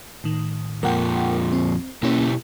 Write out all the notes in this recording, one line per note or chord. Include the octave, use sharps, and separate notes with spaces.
A2 D#3
F2 A#2 F3 A#4 F#5 G5
C4
B2 A#3 C#4 E4 G4